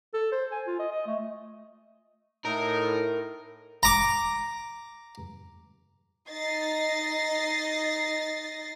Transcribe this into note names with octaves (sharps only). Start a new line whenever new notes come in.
A4
C5
G#5
F4
D#5
D#5
A3
A2 D#4 A#4
A#5 D6
D#4 D#5 A6 A#6 C7